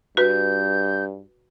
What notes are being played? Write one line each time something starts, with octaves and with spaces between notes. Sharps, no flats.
G2 F#4 B4 G6